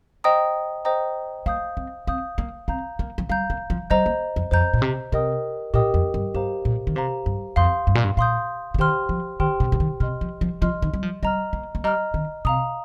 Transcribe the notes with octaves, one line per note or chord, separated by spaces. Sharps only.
C5 D#5 G5 A#5 D#6
C5 D#5 G5 A#5 D#6
A#3 F5 D#6 G6
C4
C4 F5 D#6 G6
A#3
C4 F5 A#5 G6
A#3
F3
G3 F5 A#5 G6
A#3
F3
G3 C5 D#5 A#5 G6
A#3
F2
F2 C5 D#5 A#5 G6
A#2
C3
C3 G4 A#4 D#5 G5 D#6
A#2 G4 A#4 D#5 G5 D#6
F2
G2
G2 G4 C5 F5 A#5
A#2
D#3
C3 G4 C5 F5 A#5
G2
F2 F5 C6 D#6 G6
G2
A#2
G2
A#2 F5 C6 D#6 G6
C3
D#3 G4 C5 G5 C6 F6
F3
D#3 G4 C5 G5 C6 F6
C3
C3
D#3
C3 D#5 C6 F6
F3
F3
F3 D#5 C6 F6
D#3
G3
F3
G3 D#5 A#5 F6
A#3
A#3
G3 D#5 A#5 F6
D#3
C3 F5 A#5 D#6